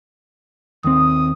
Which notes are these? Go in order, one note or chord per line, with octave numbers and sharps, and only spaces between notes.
D#2 C4 D#6